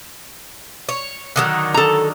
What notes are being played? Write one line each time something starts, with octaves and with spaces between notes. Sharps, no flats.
C#5
D3 D#3 F#3
A4 A#5